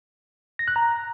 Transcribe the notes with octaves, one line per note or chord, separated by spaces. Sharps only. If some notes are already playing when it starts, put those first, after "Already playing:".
A#6
F#6
A#5